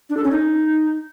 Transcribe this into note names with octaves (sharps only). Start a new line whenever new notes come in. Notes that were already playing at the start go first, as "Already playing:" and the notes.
D4
A4
C#4
D#4